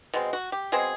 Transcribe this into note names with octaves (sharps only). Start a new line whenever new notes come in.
B2 G#3 C4
F#4
G4
B2 G#3 C4 G#4